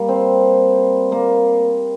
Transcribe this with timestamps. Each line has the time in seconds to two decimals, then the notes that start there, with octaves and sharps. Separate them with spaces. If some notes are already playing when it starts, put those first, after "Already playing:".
Already playing: G3 A#3
0.09 C4
1.12 A#3